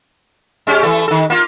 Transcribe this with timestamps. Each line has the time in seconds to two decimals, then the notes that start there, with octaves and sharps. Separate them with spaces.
0.67 G#3 C#4 G4
0.83 E3 A3 A4
1.08 D#3 A4
1.30 A#3 F4